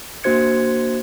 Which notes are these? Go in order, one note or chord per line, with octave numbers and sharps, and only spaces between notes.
A#3 D4 F#4 C5 G#6 C#7